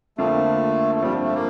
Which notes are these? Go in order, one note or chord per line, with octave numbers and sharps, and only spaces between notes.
F2 D3 F3 A3 A#3 F4
A3
G2 F3 G3 C4
A3
A#3